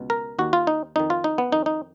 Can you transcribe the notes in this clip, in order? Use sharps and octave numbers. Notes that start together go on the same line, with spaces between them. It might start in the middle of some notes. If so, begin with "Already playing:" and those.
Already playing: C#2 B2
A#4
D#2 D#3 F#4
F4
D#4
F2 D#3 D#4
F4
D#4
B3
F2 D#3 D#4
D#4